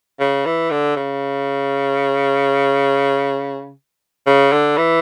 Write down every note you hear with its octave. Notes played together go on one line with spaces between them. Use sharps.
C#3
E3
D3
C#3
C#3
D3
E3